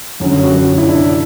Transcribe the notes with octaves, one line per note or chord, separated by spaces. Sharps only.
F#2 D3 F#3 C#4
F#4
E4
D4